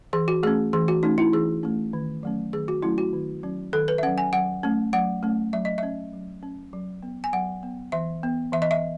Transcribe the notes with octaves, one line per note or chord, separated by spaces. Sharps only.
E3 G#4
F#4
A3 C#4 G#4
E3 G#4
F#4
A3 C#4 D#4
E4
E3 G#4
A3 C#4
D#3
F#3 A3 C#4
D#3 G#4
F#4
F#3 A3 C#4 E4
F#4
D#3
F#3 C#4
D#3 A4
B4
E5
F#3 C#4 F#5
G#5
F#3 F#5
A3 C#4
F#3 F#5
A3 C#4
F#3 E5
D#5
C#4 E5
F#3
C#4
F#3
B3
G#5
F#3 F#5
B3
E3 E5
B3
E3 E5
D#5
E5